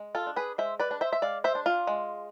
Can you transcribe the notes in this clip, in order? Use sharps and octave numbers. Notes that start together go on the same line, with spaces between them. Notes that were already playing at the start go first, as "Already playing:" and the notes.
Already playing: G#3
F4 A4
D4
G#4 B4
G#3 C5 E5
B4 D5
D4
C5 E5
E5
G#3 D5 F5
C5 E5
D4
F4
G#3